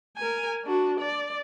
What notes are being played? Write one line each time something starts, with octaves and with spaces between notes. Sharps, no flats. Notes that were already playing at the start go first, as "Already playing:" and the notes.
A#4 G#5
D4 F#4
D5